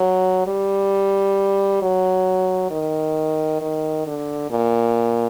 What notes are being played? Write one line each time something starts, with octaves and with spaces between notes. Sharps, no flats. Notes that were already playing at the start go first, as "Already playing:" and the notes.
Already playing: F#3
G3
F#3
D#3
D#3
D3
A#2